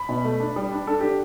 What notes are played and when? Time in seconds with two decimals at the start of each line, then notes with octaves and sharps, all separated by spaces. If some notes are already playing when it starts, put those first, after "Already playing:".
Already playing: B5
0.09 B2
0.24 A3
0.40 D4
0.56 G3
0.72 D4
0.87 D4 A4
1.00 D3 G4